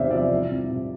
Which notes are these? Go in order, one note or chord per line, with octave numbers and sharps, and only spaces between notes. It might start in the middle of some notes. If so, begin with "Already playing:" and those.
Already playing: E2 C3 C5 D5 E5 F5
F3 D5 E5
C2
C2
C3